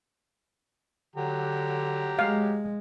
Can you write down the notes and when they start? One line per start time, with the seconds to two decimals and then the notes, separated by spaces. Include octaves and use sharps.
1.16 D3 F#3 G4 A#5
2.19 G#3 F5